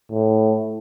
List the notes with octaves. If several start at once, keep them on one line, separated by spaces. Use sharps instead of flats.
A2